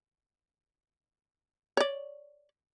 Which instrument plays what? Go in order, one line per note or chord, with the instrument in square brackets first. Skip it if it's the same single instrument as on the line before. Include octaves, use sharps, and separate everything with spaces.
[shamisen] C#5 D5